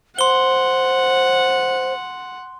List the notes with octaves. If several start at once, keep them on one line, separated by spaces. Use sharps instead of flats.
C5 F#5 C6 G7